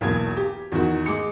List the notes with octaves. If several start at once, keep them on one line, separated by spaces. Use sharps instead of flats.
B1 E2 A#3 G#6
G4
E2 D#3 F#4
G#3 D6 C#7